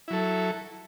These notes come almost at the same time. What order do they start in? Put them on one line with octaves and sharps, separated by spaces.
E4 F#3 A4